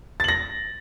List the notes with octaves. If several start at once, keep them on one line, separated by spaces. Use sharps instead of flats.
A6 A#6 F#7